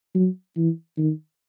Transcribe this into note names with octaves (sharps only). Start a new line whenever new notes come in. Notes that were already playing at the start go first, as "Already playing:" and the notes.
F#3
E3
D#3